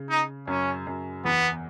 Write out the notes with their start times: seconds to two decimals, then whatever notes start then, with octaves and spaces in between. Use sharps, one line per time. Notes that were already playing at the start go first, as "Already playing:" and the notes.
Already playing: C#3
0.10 D#4
0.47 F#2 C#4
0.87 F#2
1.25 E2 B3